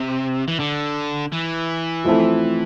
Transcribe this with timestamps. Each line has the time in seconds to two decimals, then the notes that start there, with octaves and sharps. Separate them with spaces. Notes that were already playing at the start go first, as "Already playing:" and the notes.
Already playing: C3
0.48 E3
0.59 D3
1.32 E3
2.04 F3 A3 C4 E4 A4